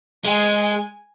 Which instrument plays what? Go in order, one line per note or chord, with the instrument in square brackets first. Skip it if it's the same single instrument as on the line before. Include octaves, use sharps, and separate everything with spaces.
[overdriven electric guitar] G#3 [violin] G#5